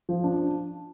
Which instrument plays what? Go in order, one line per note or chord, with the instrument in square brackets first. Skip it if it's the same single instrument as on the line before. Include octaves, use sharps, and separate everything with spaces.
[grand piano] F3
D4